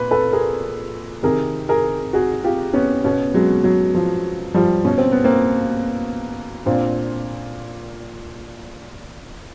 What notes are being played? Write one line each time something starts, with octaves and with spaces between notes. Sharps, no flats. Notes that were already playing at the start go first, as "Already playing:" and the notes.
Already playing: A#2 B4
A4 B4
G#4 A#4
C3 D#3 G#4 A#4
G#4 A#4
F#4 G#4
F4 G4
B3 C#4
B2 B3 C#4
F#3 G#3
F#3
F3
F3 G3
B2 C#4
C4
B3
A#3 C4
A#2 C4 D4